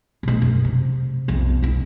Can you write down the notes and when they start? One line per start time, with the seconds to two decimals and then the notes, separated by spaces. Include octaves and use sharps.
0.23 B2 A3
0.42 F#2
0.65 C3
1.28 B1 F2
1.62 C2 E4